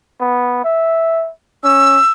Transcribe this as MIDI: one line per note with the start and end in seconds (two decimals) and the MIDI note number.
0.21 0.64 59
0.64 1.30 76
1.64 2.00 61
1.64 2.12 88